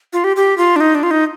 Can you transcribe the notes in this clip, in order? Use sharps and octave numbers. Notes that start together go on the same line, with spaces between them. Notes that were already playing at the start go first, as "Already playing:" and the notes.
F4
G4
G4
F4
D4
D#4
D4
F4
D#4